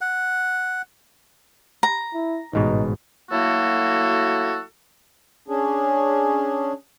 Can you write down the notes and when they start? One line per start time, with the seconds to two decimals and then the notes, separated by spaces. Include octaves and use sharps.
0.01 F#5
1.83 A#5
2.14 E4
2.53 A1 G#2 B2 D#4
3.31 F#3 A3 A#3 E4 F#4 A4
5.48 C#4 D4 G#4